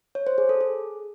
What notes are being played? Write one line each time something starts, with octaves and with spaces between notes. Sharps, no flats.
C#5
C5
G#4
A4
G#4